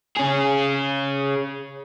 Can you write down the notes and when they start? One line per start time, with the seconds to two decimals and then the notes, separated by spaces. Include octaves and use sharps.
0.17 C#4 G#4